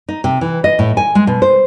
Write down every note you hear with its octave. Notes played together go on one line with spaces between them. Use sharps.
D#4
C3
E3
D#5
A2
G#5
G#3
B2
C5